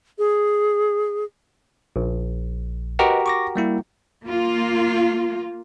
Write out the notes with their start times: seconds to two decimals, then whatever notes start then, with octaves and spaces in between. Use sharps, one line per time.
0.18 G#4
1.96 A#1
2.99 F#4 G4 A#4 B4 D#5
3.26 C#6 D6 A#6
3.56 G3 A#3 E4
4.24 A#3 F4